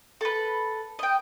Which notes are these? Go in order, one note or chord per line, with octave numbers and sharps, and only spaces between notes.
A4 B4
D#5 G5